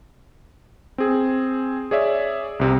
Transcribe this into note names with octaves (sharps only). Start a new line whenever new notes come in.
C4 G#4
G#4 C#5 D5 E5
C2 C3